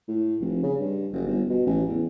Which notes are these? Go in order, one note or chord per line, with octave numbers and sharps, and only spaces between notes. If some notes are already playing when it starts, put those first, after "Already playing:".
A2
F1
C#3
G2
F#1
G1
B2
A1
E2